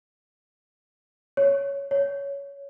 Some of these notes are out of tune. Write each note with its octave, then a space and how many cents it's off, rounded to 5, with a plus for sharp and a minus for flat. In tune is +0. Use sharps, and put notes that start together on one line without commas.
C#5 +10
C#5 +15